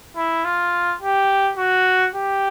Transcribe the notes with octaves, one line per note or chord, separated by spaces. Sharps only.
E4
F4
G4
F#4
G4